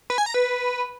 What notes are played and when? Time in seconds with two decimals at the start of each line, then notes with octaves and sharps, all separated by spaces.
0.10 B4
0.18 G#5
0.26 A#5
0.34 B4